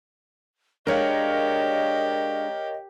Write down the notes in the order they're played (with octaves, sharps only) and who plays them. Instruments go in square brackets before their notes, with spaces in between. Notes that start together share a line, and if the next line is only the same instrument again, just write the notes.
[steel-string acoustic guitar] G#3 D4 [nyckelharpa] G4 [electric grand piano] A#4 C#5 F5 [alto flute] D#5